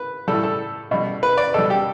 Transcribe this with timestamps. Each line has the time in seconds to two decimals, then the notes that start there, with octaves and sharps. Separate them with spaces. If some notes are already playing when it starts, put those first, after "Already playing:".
Already playing: B4
0.28 A2 G3 A4
0.43 A4
0.91 B2 G3
1.23 B4
1.38 D5
1.54 B2 G3 A4
1.70 G4